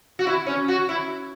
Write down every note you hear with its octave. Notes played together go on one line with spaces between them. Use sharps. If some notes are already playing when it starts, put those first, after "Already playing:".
F#4
E4
C#4
F#4
E4